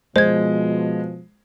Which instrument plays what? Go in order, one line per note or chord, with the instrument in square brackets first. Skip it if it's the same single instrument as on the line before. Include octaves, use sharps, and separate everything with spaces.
[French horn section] B2 F3 [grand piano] G#3 [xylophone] C5 G#6